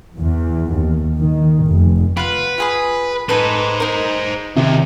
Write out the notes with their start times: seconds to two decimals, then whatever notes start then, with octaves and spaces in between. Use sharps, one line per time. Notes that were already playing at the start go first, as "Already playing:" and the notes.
0.17 E2
0.72 D#2
1.20 D#3
1.66 F1
2.17 F4 B4 F#5
2.58 F4 G#4 B5
3.29 D#4 G#4 A4 B4 C5
3.80 D#4 A#4
4.56 D#2 C3